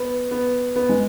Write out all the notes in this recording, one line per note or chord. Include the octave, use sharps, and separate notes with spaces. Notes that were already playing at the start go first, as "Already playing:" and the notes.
Already playing: B3
B3
B3
G#3